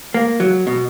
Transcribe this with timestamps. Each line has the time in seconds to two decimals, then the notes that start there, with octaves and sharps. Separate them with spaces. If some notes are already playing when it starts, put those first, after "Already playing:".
0.14 A#3
0.40 F#3
0.67 B2